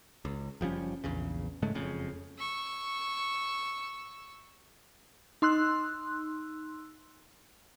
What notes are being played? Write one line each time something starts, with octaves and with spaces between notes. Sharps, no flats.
C#2
F#1 F3 G3 C#4
A#1 E2 C#3
G#2 C#3 G#3 A3
F#1 F2 C#3
C#6 E6
D#4 C6 E6 F#6